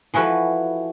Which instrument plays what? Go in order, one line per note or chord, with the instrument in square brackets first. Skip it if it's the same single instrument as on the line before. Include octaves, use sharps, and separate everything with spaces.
[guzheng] E3 F3 F#4 A4 B4